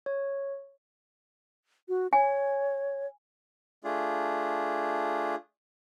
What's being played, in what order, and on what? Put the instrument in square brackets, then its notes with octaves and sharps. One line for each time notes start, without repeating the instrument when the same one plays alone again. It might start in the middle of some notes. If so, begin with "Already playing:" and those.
[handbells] C#5
[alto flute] F#4
[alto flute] C#5 [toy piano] G#5
[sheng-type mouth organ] A3 D4 F4 G#4